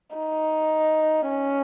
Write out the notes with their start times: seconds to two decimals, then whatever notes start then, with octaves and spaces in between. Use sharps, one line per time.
0.16 D#4
1.29 C#4